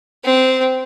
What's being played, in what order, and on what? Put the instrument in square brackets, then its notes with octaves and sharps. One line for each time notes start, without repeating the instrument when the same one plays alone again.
[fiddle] C4